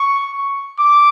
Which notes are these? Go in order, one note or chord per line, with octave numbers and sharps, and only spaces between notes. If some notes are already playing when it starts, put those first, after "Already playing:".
Already playing: C#6
D6